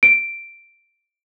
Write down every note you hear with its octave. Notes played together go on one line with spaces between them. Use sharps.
D7